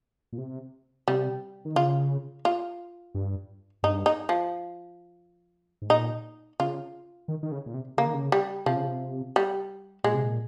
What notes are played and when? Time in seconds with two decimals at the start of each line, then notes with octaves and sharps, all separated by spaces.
0.33 A#2
0.38 C3
1.08 C3 G3
1.65 D#3
1.76 C#3 F4
2.45 F4
3.15 G2
3.83 G2 D#4
4.06 D#4
4.29 F3
5.82 G#2
5.90 A#2 D#4
6.60 C#3 F4
7.28 D#3
7.43 D#3
7.52 C#3
7.66 A#2
7.74 C3
7.97 C#3 A#3
8.06 D#3
8.14 C#3
8.32 G3
8.66 C3 F3
8.76 C#3
8.87 C3
9.36 G3
10.04 A#2 G#3
10.14 C3
10.24 A#2